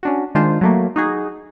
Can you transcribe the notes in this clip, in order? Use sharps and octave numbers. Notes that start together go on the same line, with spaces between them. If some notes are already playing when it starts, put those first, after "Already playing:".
C#4 D4 F#4
D#3 G#3 D4 F4 C5
F#3 A3 A#3
D#4 F#4 G#4